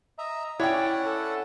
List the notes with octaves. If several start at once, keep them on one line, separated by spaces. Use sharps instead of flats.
D#5 E5 A#5
C#4 E4 C#5 D5 F#5 G5
A4